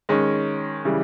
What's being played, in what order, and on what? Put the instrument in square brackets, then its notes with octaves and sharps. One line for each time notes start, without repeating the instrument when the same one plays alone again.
[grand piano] D#3 G#3 C#4
C#3 E3 G3